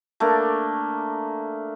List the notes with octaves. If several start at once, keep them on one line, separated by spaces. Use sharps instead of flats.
A3 A#3 D4